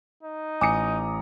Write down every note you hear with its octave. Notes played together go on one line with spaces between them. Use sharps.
D#4
A1 G#5 A#5 D6 D#6 C#7